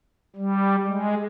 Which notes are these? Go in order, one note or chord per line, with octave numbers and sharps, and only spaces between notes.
G3
G#3